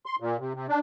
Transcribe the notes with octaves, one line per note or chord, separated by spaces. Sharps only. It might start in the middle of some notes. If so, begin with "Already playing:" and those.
C6
A#2
C3
C3
D4